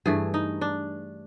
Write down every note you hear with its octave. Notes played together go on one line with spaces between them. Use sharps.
G2 E3 A3 G#4
D#4
D4